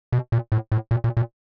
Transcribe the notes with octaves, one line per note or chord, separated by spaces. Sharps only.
B2
A#2
A2
A2
A#2
A#2
A#2